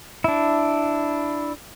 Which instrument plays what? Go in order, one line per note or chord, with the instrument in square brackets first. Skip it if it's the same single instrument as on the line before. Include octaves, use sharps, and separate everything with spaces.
[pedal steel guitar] D4 E4